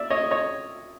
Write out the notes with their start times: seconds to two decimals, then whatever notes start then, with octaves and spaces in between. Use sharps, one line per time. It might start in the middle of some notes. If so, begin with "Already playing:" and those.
Already playing: D5 E5
0.10 C#5 D#5
0.31 C#5 D#5